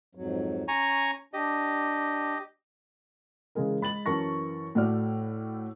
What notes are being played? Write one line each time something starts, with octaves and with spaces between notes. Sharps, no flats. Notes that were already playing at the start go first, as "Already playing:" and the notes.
F2 G#2 F#3
C#4 G#5 A#5 C#6
D4 G4 D#5
C#3 E3 G#3 G#4 A#4
G#3 B5 A6 F#7
F#2 E3 A#4 A5 C#6 A#6
A2 A3 F#4 D5 F6